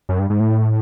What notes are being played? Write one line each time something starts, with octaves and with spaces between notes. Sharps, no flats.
F#2
G2
G#2
A2